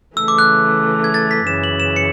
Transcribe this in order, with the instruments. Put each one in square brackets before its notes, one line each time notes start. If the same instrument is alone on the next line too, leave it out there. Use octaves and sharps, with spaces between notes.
[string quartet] C#3 E3 A3 [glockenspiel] E6
[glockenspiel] D6
F#6
G#6
A6
B6
[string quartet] F#2 C#3 E3 [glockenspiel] E7
[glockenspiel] F#7
E7
C#7